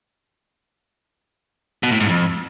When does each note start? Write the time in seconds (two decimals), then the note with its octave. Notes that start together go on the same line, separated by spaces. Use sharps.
1.83 B2
1.92 A2
2.00 G#2
2.09 F2